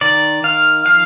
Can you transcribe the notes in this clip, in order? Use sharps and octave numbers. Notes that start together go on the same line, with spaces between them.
D#3 D5
D#3 F5
F3 F5